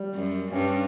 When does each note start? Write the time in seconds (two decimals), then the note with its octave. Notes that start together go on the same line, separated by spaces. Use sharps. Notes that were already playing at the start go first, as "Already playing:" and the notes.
Already playing: G3
0.14 F#2
0.52 G2 C#4